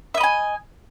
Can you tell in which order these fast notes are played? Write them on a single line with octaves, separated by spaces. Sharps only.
E5 D#5 B5 G#5